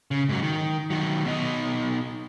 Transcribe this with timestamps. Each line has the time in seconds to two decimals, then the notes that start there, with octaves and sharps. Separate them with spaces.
0.11 C#3
0.29 G#2 F#3
0.42 D#3
0.90 D#3 F#3
1.25 B2 D#4